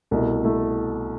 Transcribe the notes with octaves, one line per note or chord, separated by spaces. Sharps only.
C2 B2 A3 E4
A3 E4